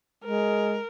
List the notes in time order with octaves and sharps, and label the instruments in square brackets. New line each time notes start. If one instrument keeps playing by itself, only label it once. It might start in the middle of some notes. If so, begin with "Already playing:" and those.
[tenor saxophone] G#3 [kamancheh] A#4